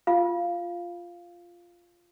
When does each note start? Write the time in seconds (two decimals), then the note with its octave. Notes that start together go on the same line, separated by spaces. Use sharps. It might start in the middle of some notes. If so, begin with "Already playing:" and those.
0.07 F4 F5